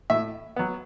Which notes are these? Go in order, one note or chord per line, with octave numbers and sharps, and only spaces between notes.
A2 E5
F#3 B3